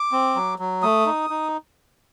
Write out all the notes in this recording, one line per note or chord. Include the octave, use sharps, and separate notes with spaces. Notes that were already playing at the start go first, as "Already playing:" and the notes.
Already playing: D6
C4
F#3
F#3
A3 D#6
D#4
D#4